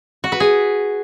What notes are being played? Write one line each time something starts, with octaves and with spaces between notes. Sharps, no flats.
F#4
B4
G#4